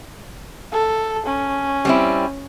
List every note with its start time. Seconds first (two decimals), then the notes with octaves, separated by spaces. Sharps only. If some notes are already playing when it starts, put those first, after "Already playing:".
0.72 A4
1.26 C#4
1.85 G3 C4 E4